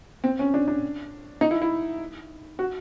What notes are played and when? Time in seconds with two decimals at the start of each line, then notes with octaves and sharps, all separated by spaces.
0.24 C4
0.39 C#4
0.54 D4
0.68 D4
1.41 D#4
1.51 E4
1.62 E4
2.59 F#4